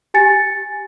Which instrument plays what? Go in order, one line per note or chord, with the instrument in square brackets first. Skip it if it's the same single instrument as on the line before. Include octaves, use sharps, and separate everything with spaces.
[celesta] G4 G#5 A6 C#7